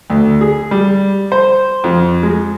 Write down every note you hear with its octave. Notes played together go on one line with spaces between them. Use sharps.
D2
G#4
G3
C5
F2
G#3